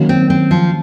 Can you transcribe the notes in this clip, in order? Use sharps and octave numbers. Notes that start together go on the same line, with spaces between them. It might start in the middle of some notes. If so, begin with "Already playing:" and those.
Already playing: D#3 F#3 A#3 C#4
C4
C4
F3